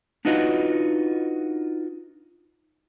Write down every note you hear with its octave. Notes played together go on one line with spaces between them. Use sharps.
D4 D#4 F4 F#4 B4 D#5